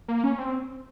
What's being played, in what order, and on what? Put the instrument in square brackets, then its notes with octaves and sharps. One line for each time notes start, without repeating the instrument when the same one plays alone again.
[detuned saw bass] A#3
C#4
C4